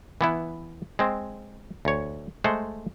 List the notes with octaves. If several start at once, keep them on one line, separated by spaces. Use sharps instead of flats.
E3 B3 E4
G#3 C4
D2 C#5
G#3 A3 C5 F#5